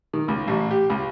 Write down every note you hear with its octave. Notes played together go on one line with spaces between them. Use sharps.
D#3
C#2
A1
G4
C#2